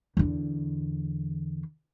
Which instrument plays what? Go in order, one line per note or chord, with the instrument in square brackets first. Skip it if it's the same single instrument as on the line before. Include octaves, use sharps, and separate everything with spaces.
[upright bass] E2 D3